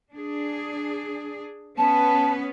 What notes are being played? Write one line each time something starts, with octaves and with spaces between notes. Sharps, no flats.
D4 G#4
B3 C#4 B4 A5